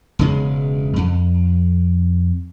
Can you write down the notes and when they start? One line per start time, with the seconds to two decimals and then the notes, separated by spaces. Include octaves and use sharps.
0.19 E1 C#3 G#3
0.96 F2